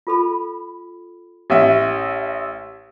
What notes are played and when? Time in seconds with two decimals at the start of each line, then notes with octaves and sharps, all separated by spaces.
0.07 F4 A4 B5
1.50 A1 G4 E5